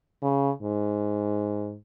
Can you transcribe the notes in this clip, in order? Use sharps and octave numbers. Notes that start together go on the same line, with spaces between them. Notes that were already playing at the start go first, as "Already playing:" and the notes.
C#3
G#2